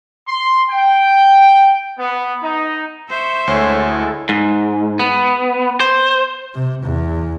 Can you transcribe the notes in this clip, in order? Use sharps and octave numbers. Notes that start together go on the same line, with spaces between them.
C6
G5
B3
D#4
C5 E5 C#6 G6
D2 G#3 E4 A4 C#5
G#2
B3
C5
C3
E2